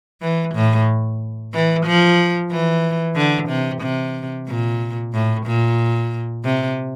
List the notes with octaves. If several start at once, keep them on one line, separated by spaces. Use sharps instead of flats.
E3
A2
E3
F3
E3
D3
C3
C3
A#2
A2
A#2
C3